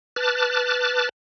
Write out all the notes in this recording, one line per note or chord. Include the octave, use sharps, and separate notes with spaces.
B4 A5 D6 F6 F#6 A6